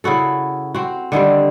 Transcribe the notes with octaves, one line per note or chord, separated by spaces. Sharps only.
C#3 E4 F#4 A4
C4 F#4
D3 D#3 G3 C4